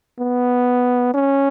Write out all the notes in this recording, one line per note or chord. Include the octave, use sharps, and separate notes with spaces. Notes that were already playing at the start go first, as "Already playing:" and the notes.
B3
C#4